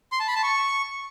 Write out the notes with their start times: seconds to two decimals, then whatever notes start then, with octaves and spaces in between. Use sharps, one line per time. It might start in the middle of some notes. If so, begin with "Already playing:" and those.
0.12 C6
0.20 A5
0.28 B5
0.35 A5
0.43 C#6